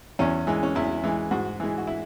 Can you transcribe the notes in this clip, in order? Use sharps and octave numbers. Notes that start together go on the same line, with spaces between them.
E2 C#4
E3 G#3
C#4
E2 E4
E3 G#3
G#2 F#4
E3 G#3
F#4
E4